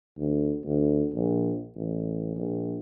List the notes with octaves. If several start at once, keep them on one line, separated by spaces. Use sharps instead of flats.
D2
D2
A#1
A1
A#1